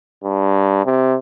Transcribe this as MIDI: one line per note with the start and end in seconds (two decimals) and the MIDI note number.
0.24 0.84 43
0.86 1.17 48